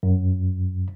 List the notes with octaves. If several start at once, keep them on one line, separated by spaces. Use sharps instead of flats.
F#2